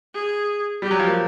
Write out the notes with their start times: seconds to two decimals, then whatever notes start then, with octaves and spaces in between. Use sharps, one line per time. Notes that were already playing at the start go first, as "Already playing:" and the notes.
0.14 G#4
0.82 G3 G4
0.91 F#3
1.00 F3
1.08 A#3